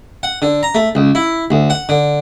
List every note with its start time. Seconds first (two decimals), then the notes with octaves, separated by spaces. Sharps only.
0.23 F#5
0.42 D3
0.63 A#5
0.75 A3
0.95 C#2
1.15 E4
1.51 D2
1.70 F#5
1.89 D3